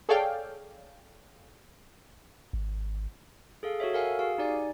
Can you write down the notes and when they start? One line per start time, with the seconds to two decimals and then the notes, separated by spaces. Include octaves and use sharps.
0.09 G#4 A4 C#5 D5 F5 G5
2.53 G#1
3.63 G#4 A4 F5
3.80 F#4 A4 C#5 E5
3.93 A4 A#4 F5 F#5 G#5
4.19 F#4 G#4 F5
4.38 D#4 G4 D5 G#5